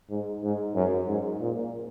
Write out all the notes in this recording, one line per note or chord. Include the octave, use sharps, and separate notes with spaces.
G#2
G#2
F#2
G#2
A#2